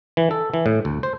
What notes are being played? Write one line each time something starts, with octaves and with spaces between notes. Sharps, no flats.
E3
A4
E3
A2
D2
C5